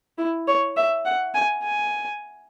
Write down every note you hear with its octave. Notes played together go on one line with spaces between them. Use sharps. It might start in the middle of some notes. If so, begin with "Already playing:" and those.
E4
C#5
E5
F#5
G#5
G#5